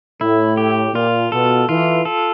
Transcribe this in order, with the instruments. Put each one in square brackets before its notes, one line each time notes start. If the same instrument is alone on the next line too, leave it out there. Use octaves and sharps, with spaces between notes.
[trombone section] A2 [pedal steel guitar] E4
[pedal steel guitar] G4
[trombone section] A#2 [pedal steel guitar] F4
[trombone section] B2 [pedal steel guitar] A4
[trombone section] E3 [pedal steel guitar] F4
[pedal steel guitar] A4